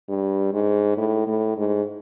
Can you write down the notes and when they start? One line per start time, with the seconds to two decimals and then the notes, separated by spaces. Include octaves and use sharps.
0.08 G2
0.53 G#2
0.97 A2
1.27 A2
1.57 G#2